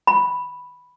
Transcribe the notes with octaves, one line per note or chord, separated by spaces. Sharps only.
B5